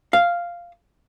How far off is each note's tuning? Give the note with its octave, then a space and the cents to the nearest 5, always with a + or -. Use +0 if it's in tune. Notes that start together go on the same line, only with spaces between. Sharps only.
F5 -5